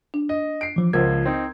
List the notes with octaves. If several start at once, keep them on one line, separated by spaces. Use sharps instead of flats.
D4
D#5
C7 D7
E3 F3
C#2 F3 A#4 C5 F#5 G#6
C4 D#4